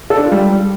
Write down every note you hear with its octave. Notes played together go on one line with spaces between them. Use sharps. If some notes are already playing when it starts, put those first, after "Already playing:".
A4
D4
F4
G3